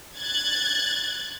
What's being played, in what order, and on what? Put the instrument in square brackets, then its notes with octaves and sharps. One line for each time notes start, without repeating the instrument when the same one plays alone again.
[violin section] F#6 G#6 A6